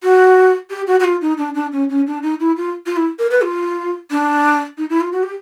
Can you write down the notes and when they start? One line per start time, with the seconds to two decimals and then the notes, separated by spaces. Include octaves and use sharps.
0.03 F#4
0.70 G4
0.87 F#4
1.00 F#4
1.04 F4
1.21 D#4
1.38 D4
1.55 D4
1.72 C#4
1.89 C#4
2.07 D4
2.23 D#4
2.40 E4
2.57 F4
2.86 F4
2.96 E4
3.19 A#4
3.31 B4
3.42 F4
4.11 D4
4.78 D#4
4.90 E4
5.01 F4
5.12 F#4
5.23 G4